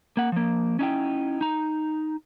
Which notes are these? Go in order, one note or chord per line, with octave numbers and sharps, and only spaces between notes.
A#3 F#5
F3 A#3
C#4 D#4 E4 G5
D#4 A#5